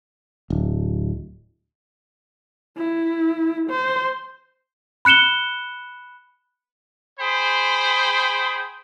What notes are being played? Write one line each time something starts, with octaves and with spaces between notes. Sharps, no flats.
D1
E4
C5
B5 F#6 C#7 E7 G7
G#4 C5 G5 B5